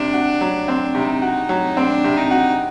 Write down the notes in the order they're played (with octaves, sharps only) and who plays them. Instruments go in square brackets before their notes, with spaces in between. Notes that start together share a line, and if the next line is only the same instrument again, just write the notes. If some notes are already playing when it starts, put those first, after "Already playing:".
Already playing: [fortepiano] C3 [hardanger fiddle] D4
[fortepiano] F#4
F#3
C4
[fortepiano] C3 [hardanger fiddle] D#4
[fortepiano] F#4
F#3
[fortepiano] C4 [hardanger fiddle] D4
[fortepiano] C3
[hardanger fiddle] D#4
[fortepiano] F#4